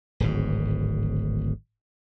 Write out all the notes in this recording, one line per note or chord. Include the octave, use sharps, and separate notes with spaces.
D1 G#1 G#2